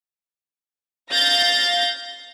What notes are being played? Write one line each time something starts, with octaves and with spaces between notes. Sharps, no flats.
F5 G6 A6 A#6